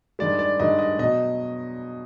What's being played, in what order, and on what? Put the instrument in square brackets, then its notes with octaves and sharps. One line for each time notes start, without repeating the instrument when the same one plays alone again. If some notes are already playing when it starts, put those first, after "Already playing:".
[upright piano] G2 D#3 G#3 D5
D5
G2 D#3 G#3 D#5
D#5
B2 F#3 D#5